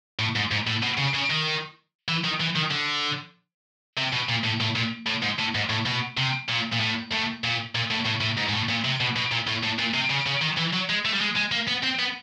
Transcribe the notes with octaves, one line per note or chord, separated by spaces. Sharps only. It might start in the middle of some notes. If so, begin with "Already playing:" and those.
A2
G#2
G#2
A2
B2
C#3
C#3
D#3
E3
D#3
E3
D#3
D3
C3
B2
A#2
A2
A2
A#2
A2
G#2
A2
G#2
A2
B2
C3
A#2
A#2
A2
A2
A#2
A#2
A2
A2
A2
G#2
G#2
A2
A#2
C3
B2
B2
A#2
A2
A2
A#2
C3
C#3
C#3
D#3
E3
F#3
G#3
A3
G3
G#3
G#3
A#3
B3
C4
B3